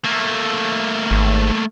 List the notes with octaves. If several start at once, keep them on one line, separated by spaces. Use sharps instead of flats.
A3 A#3
G#1